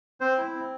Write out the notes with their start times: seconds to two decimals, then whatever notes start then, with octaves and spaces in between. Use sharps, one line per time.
0.21 C4 C5
0.38 E4
0.55 C4